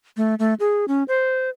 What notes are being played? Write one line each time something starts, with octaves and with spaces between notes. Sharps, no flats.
A3
A3
G#4
C#4
C5